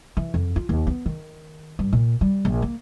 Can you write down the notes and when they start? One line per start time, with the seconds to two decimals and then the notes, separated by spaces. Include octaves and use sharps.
0.17 E3
0.34 F2
0.56 F4
0.69 D#2
0.87 B3
1.06 D#3
1.79 G2
1.93 A#2
2.21 G3
2.45 A#1
2.62 A#3